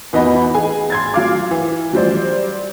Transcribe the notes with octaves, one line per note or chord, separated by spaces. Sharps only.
E2 B3 D#4 F#4 D#5 B5
G#4 G#5
C6 G#6 A6
F#3 F5 D6
E3
F#3 G3 C5 D5